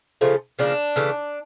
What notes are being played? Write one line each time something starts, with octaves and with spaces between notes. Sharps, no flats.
C#3 F3 A3
C#3 F3 A#3 D4
C#3 E3 A3